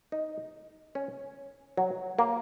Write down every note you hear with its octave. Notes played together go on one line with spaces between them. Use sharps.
D#4
C#4
F#3
A#3